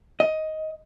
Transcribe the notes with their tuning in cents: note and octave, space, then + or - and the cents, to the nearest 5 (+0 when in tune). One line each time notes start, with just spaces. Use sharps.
D#5 +10